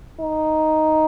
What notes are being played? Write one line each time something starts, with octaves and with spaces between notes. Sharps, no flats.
D#4